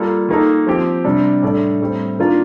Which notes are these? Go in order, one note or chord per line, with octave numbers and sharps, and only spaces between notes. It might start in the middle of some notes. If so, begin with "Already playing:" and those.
Already playing: G3 A#3 F4 A4
D#3 A#3 D#4 A4
F3 C4 G4
C3 G3 D4
A2 G3 D4 A4 D5
A2 G3 C4
D#3 A#3 D4 F4